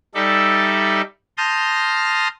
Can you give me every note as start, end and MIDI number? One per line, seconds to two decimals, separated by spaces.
0.15 1.02 55
0.15 1.02 63
0.15 1.02 69
0.15 1.02 74
0.15 1.02 76
1.38 2.28 81
1.38 2.28 84
1.38 2.28 87
1.38 2.28 89
1.38 2.28 91
1.38 2.28 94